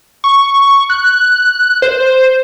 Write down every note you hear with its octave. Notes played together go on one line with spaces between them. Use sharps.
C#6
F#6
C5